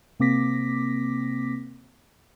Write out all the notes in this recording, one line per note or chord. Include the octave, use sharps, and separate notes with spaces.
C3 A#3 C4 D6 A#6 B6